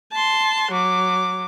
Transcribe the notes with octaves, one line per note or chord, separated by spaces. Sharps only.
A5 C6
F#3 D6